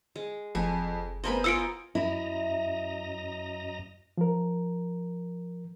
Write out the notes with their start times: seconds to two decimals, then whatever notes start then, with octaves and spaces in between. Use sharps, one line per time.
0.16 G#3
0.55 F#1 F2 G#5
1.24 B3 A#4 C5 D#5 G#5 B5
1.44 F4 D#5 G#5 E6 C#7 D7
1.95 F#2 E4 D#5 A#5
4.17 F3 A#4